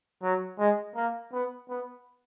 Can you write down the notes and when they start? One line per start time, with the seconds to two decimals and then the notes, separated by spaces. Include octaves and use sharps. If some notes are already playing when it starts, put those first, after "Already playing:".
0.23 F#3
0.59 G#3
0.96 A#3
1.33 B3
1.69 B3